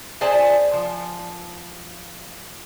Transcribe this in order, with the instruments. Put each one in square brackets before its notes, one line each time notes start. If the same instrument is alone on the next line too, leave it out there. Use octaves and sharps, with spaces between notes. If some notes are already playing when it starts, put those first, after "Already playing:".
[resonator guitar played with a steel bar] G#4 C5 D5 E5 G#5 A5
F3